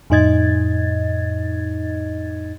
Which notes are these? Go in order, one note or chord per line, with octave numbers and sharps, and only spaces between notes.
F2 A2 D#4 D#5 G#6 A6